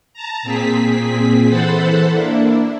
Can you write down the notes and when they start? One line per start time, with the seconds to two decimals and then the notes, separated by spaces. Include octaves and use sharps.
0.14 A5 A#5
0.43 A#2 C4 G#4 B6
1.49 E3 A4 C5 F#5 A5 B5
2.11 A#3 D4 E4